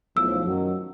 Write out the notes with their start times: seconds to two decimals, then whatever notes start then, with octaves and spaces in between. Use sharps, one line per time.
0.16 B1 A2 F3 E6
0.45 F#2 D#3 F#3